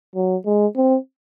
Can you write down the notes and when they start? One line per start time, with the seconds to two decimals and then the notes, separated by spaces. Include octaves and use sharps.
0.16 F#3
0.46 G#3
0.76 C4